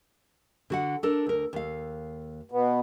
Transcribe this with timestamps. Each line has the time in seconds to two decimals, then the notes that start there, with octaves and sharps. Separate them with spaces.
0.70 D3 F#4 F#5
1.03 D4 A4 A#4
1.26 D2 A#4
1.53 D#2 F5
2.51 B2 B3